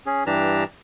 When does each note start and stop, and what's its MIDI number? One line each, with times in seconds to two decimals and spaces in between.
0.06 0.24 61
0.06 0.24 68
0.27 0.64 43
0.27 0.64 52
0.27 0.64 62
0.27 0.64 67
0.27 0.64 81
0.27 0.64 82